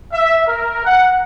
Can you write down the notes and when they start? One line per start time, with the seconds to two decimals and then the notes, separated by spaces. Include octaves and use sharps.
0.12 E5
0.47 A#4
0.85 F#5